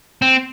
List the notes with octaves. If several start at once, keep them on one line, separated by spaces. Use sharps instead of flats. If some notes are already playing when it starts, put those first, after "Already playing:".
C4